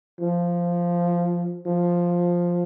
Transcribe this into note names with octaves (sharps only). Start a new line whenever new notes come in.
F3
F3